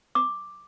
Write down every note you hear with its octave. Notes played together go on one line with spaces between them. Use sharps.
D6